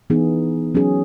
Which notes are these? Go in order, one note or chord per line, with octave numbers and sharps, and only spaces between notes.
E3 B3 D#4 G#4
F#3 C#4 G#4